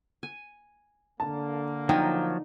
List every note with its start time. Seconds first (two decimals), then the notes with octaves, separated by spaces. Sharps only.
0.23 G#5
1.20 D3 A#3 A5
1.89 F3 F#3 D#4 G5